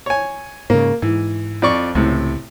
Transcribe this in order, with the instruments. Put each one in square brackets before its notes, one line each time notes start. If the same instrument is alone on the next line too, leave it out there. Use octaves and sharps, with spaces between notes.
[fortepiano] C#5 G#5
[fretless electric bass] G#2 C#3 [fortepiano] A#3
[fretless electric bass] G#2 [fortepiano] E3
[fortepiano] F2 D5 C#6
[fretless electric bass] C#2 [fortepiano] A2 C3